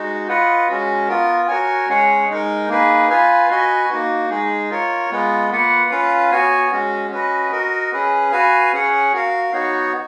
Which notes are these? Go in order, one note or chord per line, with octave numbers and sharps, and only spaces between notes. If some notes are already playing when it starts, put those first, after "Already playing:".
Already playing: G#3 D#4 F#4
F4 B4 D#5 F#5
G#3 C#4 F#4
B3 F4 A#4
F#4 A#4 C#5 G#5
G#3 C#4 G#4 C#5 F#5
G#3 D#4 A#4
A#3 D#4 G#4 B4
F4 B4 F5 G#5
F#4 B4 D#5 G#5
A#3 D#4 F#4
G#3 D#4 G#4
F4 A#4 C#5
G#3 B3 F4
A#3 F4 B4 F#5
C#4 F4 B4 F5
B3 F#4 C#5 G#5
G#3 C#4 F#4
C#4 F#4 B4 D#5
F#4 A#4 D#5
C#4 G#4 B4
F#4 B4 F5 G#5
C#4 G#4 C#5 F#5
F#4 A#4 F5
B3 D#4 F#4 C#5